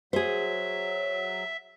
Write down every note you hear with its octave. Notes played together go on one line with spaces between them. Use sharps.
F#3 G#4 C5 E5